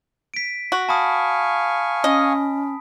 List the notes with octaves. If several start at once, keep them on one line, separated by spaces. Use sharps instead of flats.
B6 D7
F#4
F5 G#5 A5 B5 C#6 D#6
C#4 D#5